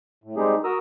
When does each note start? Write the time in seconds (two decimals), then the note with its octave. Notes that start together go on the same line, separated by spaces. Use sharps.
0.24 A2
0.37 G3 G#3 C4 D#4 G4 G#4
0.64 F#4 A#4 A#5 D#6 E6